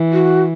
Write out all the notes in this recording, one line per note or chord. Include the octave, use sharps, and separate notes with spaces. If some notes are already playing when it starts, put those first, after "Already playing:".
Already playing: E3
F#4